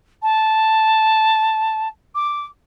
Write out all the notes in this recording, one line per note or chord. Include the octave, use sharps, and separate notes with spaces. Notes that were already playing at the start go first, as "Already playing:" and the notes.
A5
D6